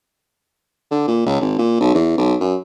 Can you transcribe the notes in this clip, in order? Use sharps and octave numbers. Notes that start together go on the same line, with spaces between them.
D3
A#2
C#2
G#1
A#2
B1
E2
B1
F#2